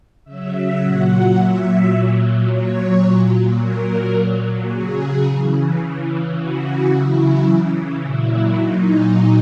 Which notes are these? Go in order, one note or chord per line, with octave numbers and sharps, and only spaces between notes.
C#3 F#3 E5
A#2 F#3 F#5
A#2 F#3 E5
A#2 F#3
A#2 F#3 C#5
A#2 F#3
A#2 F#3 A#4
A#2 F#3
C#3 F#3 G#4
C#3 E3
C#3 E3
C#3 E3 F#4
C#3 F#3 E4
C#3 E3
A#2 F#3 E4
A#2 F#3 D#4